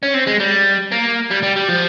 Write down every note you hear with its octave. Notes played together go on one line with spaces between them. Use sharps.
C#4
C4
G#3
G3
A#3
G3
G3
G3
F3